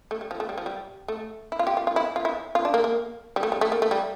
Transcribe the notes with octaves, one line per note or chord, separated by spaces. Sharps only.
A3
G3
F3
A3
G3
F3
G3
A3
E4
F4
G4
F4
F4
E4
F4
E4
F4
D4
A#3
A#3
G3
A3
G3
A3
A#3
A3
G3